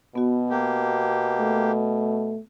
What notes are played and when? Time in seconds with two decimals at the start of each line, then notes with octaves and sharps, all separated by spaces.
0.15 B2 B3 F#4
0.50 A#3 G4
1.39 A3